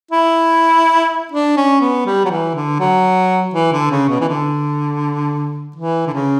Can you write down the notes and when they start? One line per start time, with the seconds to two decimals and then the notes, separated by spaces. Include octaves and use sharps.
0.11 E4
1.32 D4
1.57 C#4
1.81 B3
2.06 G3
2.25 F#3
2.31 E3
2.55 D3
2.79 F#3
3.54 E3
3.72 D3
3.91 C#3
4.09 B2
4.20 E3
4.28 D3
5.76 E3
6.07 D3
6.13 C#3